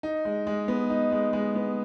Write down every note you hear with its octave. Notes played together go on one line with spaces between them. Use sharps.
D#4
G#3
G#3
B3
D#4
G#3
G#3
B3